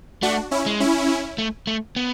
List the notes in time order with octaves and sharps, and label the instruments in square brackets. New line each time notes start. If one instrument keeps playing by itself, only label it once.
[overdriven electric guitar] A3 [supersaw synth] D4 F#4
[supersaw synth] C#4 E4
[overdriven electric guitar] G#3
[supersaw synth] C#4 E4
[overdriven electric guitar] A3
A3
B3